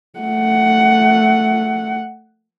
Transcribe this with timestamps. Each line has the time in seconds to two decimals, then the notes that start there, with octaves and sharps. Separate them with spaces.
0.19 A3 F#5